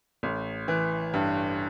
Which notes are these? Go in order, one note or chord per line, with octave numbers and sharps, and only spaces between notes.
A1
E3
G2